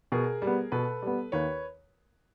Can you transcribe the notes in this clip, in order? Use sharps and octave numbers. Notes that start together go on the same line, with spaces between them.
B2 G#4 A#4
G3
B3
B2 A4 B4
G3 B3
D#2 B4 C#5